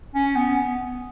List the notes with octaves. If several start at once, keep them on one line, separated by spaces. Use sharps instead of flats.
C#4
B3